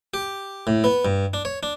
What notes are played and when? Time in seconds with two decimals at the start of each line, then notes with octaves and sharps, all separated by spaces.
0.14 G4
0.67 A2
0.84 B3
1.05 G2
1.34 D4
1.45 C#5
1.63 D4